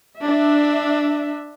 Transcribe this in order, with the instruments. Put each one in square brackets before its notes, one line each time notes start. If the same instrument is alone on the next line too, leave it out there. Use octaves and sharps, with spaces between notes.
[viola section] D4 E5